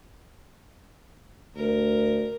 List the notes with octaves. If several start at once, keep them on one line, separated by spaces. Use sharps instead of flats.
D2 A#4